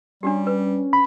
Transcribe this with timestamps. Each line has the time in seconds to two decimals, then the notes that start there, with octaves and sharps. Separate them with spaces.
0.23 G3 C#4 D4 F#4 G4
0.47 B4
0.93 B5